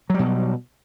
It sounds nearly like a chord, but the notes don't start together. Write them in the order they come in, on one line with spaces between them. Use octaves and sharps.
F#3 G3 B2